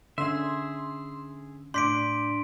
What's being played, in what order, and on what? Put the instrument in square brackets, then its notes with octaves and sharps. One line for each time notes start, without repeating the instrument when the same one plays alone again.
[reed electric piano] D3 C#4 [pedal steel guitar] G#4 E5 [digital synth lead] C6
[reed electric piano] A2 D5 G6 [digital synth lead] D4 [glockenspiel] C6 B6 D7